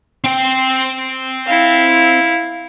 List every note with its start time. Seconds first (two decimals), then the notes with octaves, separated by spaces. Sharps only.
0.24 C4 G5
1.46 E4 F5